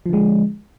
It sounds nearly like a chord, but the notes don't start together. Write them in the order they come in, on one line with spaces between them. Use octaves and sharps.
F3 D3 G#3